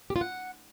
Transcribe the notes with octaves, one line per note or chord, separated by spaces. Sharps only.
G4
F4
F#5